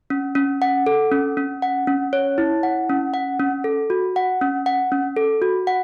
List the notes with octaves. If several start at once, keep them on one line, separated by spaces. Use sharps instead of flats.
C#4
C#4
F#5
A4
C#4
C#4
F#5
C#4
C#5
E4
F#5
C#4
F#5
C#4
A4
F#4
F#5
C#4
F#5
C#4
A4
F#4
F#5